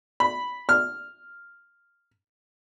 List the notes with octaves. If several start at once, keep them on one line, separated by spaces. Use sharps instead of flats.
B5
F6